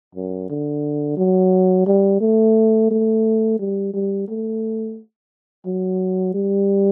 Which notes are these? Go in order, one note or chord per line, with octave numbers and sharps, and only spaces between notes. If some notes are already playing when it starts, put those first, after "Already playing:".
F#2
D3
F#3
G3
A3
A3
G3
G3
A3
F#3
G3